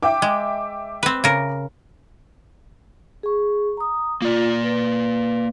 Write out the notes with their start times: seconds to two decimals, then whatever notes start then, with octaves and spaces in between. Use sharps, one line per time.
0.03 E5 G5 D6
0.22 G#3
1.03 C4 B4
1.24 C#3 A#4
3.23 G#4 C#6
3.77 A#5 D#6
4.22 A#3 F4 D5
4.64 B4